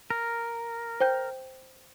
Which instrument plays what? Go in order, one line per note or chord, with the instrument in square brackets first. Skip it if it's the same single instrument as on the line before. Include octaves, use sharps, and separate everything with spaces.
[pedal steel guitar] A#4
[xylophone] C5 G5 G6